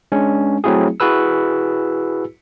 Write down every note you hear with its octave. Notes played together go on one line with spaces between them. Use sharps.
G#3 C#4 D4
F#3 A3 C4 E4 F#4 G#4
E4 F#4 G#4 B4 E6